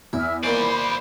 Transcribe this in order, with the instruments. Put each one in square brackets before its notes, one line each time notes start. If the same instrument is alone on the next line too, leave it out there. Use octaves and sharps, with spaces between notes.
[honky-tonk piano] E2 [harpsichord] E4 [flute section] E5 E6 F6
[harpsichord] A#2 D#3 E3 [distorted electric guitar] C5 D5 [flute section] B5